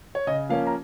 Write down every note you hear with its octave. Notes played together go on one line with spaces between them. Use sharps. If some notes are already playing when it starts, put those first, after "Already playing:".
C#5
C#3 D#5
F3 A#3 C#4 F5
A#5